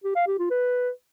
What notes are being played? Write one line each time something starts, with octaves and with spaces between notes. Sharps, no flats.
G4
F5
G4
F4
B4